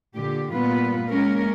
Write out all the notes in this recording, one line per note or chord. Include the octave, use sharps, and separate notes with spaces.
A#2 D3 G4
A#2 G3 B3 F4 B4
G#3 A#3 C#4 A#4